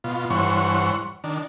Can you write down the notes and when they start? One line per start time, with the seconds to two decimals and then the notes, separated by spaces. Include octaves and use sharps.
0.04 B2 F4
0.30 G2 E3 C5 C#5 F#5 C#6
1.24 D#3 D4